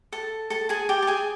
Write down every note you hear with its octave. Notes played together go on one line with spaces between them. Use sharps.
A4 A5
A4 A5
G#4 G#5
G4 G5
A5
G#4 G#5